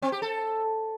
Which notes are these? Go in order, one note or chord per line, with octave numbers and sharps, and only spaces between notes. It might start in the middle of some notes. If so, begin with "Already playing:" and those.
C4
G4
A4